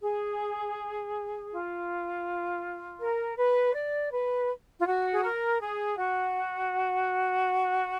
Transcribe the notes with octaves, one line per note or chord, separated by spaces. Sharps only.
G#4
F4
A#4
B4
D5
B4
F4
F#4
G#4
A#4
G#4
F#4